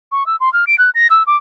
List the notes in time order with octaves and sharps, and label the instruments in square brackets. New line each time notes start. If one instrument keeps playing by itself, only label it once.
[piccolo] C#6
E6
C6
F6
D7
F#6
A#6
E6
D6